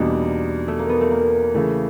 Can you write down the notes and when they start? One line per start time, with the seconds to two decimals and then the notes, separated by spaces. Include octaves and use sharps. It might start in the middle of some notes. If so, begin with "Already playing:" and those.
Already playing: E2 B2 G3 A#3 D4 D#4
0.68 A3
0.79 A#3
0.89 B3
1.01 A3
1.11 A#3
1.54 C#3 E3 A3